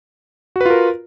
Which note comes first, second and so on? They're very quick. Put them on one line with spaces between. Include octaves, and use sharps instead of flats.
F#4 B4 F4 A#4